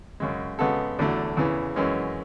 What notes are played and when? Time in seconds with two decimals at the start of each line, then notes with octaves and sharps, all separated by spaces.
0.20 F#2 C#3 G#3
0.59 C#3 G#3 B3 F#4 A4
0.99 E2 D3 F#3 A3
1.37 E2 C#3 E3
1.76 F#2 E3 G#3 C#4